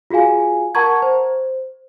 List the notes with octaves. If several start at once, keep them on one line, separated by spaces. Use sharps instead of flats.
F4 F#4 G#4 F5 G#5
A#4 F#5 A5 A#5 C#6 G#6
C5